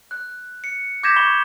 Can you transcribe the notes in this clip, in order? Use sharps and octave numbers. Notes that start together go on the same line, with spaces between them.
F#6
C#7
D6 G6 G#6 A#6 B6 E7
B5 C#6 G7